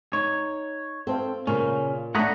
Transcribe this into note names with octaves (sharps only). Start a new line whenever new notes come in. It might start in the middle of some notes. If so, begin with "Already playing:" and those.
D#4 C#5
C4 A4 C5 F5
A#2 C#3 C#4
A3 D4 F#5 A#5 B5 C#6 D#6